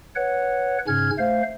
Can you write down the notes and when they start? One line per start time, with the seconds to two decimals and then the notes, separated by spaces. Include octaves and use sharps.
0.15 B4 C#5 F#5
0.87 G#2 C#3 C#4 F6 G#6
1.18 A3 C5 F5